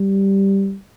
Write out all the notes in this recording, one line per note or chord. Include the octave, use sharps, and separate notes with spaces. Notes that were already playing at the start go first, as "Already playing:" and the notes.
Already playing: G3